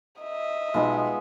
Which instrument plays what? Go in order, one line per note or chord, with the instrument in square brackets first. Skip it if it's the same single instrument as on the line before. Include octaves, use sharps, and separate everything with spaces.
[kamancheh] D#5 E5
[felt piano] B1 [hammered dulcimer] G#3 B3 F4